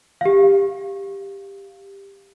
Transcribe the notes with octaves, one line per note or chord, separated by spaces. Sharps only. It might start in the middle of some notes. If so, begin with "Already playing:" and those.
G4 F5